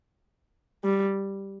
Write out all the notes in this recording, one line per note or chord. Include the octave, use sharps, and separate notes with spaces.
G3